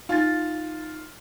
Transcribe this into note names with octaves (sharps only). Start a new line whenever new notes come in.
D#4 F4 A6